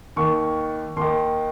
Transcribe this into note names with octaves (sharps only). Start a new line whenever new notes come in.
D#2 D#3 C#6
D#2 D#3 C6